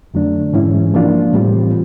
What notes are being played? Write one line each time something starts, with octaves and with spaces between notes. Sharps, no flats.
F2 D3 F#3 A3 D4
G#2 E3 G#3 C#4 E4
C#3 F3 A#3 D4 F4
A2 E3 G3 C4 F4